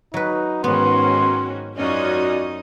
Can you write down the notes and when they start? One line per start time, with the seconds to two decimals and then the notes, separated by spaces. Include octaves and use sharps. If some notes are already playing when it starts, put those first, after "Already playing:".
0.14 F#3 D#4 B4
0.64 G#2 D#3 B3 C#4 F#4 C6
1.77 F#2 C#4 D#4 F4 F#4 D5 D#5